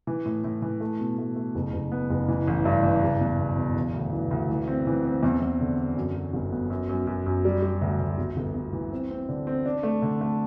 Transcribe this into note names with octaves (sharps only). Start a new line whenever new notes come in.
E3
A2
A2
E3
A3
B2
A3
A3
F#1
F#1
B3
F#1
E3
A1
G2
E3
F#1
E2
B2
B2
E1
D2
E3
D2
E3
C4
E3
C4
E2
E2
D3
D3
F#2
F#3
G1
B3
F#2
F#2
F#2
F#2
G3
G3
D2
D2
G1
G1
G1
E3
C4
C4
D3
C4
D4
A3
D3
A3